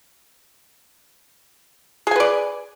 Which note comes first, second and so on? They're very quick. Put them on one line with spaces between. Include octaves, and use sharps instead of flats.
G#4 G#5 B4 D5